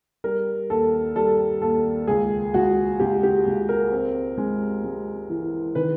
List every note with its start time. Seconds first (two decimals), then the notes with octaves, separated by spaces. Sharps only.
0.24 G3 A#4
0.70 D#2 A4
1.16 G3 A4
1.62 D#2 A4
2.07 C#2 G#4
2.54 C#2 F#4
2.99 C#2 G4
3.23 G4
3.46 C#2
3.69 A#4
3.92 C4
4.38 G#3
4.84 G#3
5.29 E3
5.75 D#3 B4